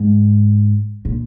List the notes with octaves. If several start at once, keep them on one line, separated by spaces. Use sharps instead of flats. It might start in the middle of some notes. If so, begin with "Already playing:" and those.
Already playing: G#2
A#2